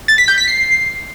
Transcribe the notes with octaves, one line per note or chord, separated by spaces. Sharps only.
A6
B6
G6
B6
C7